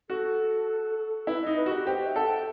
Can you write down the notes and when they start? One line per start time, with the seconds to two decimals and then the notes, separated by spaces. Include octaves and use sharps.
0.09 F#4 A4
1.27 E4 B4
1.42 D#4 D#5
1.57 B4
1.66 F#4
1.71 G4
1.86 G4 C5
2.06 E5
2.16 A4 F#5
2.25 G5